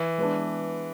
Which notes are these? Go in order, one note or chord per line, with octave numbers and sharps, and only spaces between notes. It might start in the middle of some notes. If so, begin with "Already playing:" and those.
Already playing: E3
G#3 B3 D4